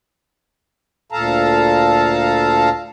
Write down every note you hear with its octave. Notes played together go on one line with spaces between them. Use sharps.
D2 A#2 A4 F5 A5 A#5